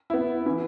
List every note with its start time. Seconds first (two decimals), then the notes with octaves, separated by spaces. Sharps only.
0.10 B3 E4
0.46 E3